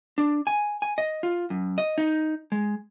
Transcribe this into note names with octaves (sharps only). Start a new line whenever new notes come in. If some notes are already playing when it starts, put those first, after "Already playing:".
D4
G#5
G#5
D#5
F4
F#2
D#5
D#4
G#3